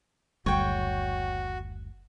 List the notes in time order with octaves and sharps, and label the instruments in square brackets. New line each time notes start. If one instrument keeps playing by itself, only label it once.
[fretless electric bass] F#1 D2 G3 [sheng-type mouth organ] F#4 [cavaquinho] C#5 G5